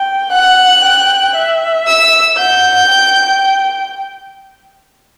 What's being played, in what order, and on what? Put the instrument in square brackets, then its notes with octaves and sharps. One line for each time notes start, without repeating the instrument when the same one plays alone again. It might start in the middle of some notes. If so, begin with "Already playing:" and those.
Already playing: [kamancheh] G5
[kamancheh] F#5 [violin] F#6
[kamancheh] G5
E5
[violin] E6
[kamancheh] F#5 [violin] G6
[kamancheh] G5